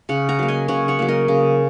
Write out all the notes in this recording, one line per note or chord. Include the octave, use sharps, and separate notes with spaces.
C#3 C#5 F#5
F#5 A#5
F#3 A#3
D#5 G#5
C#3 C#5 F#5
C#5 F#5
F#3 A#3
A#4 D#5
C#3